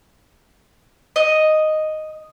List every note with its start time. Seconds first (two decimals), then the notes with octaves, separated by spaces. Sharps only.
1.16 D#5